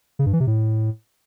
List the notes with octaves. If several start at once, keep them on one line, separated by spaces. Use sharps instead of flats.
C#3
G2
E3
C3
A2